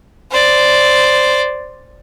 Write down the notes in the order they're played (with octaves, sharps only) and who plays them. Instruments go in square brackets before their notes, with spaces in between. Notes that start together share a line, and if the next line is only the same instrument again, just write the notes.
[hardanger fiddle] C5 D5